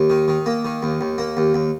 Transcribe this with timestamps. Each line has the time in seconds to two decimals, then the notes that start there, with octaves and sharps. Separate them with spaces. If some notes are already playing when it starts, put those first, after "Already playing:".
Already playing: D#2
0.10 D#3
0.28 D#3
0.46 A#3
0.65 D#3
0.83 D#2
1.01 D#2
1.18 A#3
1.37 D#2
1.54 D#2